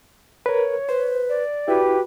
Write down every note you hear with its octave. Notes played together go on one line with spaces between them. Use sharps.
A#4 B4 C#5
B4 C5
D5
E4 F#4 G4 B4